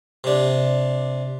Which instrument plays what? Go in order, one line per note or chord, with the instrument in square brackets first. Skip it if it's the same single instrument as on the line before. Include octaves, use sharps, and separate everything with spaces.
[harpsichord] C3 D4